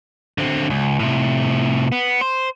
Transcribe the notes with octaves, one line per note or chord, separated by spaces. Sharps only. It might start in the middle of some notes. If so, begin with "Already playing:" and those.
D3 C4
C#2
A2 C3
B3
C5